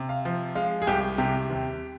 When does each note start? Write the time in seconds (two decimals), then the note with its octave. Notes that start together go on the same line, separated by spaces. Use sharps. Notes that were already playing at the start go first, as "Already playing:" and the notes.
Already playing: C3
0.09 F5
0.25 F3
0.55 G#3 F5
0.82 G#4
0.87 C2 G4
1.18 C3 G4
1.50 D#2